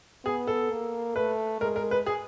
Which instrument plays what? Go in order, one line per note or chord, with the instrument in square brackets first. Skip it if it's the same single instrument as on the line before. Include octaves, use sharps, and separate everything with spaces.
[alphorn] B3 [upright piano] G#4
[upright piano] A4
[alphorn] A#3
[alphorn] A3 [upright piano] B4
[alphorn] G#3 [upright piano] A#4
[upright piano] A#4
B4
G#4